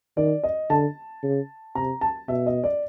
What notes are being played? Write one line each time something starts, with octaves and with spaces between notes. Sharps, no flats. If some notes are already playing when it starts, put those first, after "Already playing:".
D#3 D5
D#5
D3 A5
C#3
C3 A#5
A5
B2 E5
D#5
D5